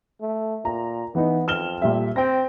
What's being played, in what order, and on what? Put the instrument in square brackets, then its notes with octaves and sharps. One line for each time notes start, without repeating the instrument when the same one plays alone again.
[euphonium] A3
[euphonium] A#2 [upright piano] A#5
[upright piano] E3 D#4 [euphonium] B3
[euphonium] F2 [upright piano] F6 E7 G7
[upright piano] A#2 G3 E5
[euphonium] C4 [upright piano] G5 C6 A#6